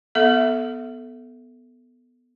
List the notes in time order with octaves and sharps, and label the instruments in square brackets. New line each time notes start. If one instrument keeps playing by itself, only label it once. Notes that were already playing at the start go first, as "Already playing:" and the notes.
[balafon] B3 A4 E5